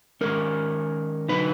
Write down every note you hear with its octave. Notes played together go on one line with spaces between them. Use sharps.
D#3 G#3 C#4 A#4
D3 F#3 B3 D#4 B4